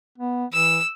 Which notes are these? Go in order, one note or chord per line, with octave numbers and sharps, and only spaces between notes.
B3
E3 E6